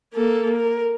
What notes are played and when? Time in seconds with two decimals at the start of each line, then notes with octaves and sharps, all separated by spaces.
0.14 A#3 A4
0.56 A#4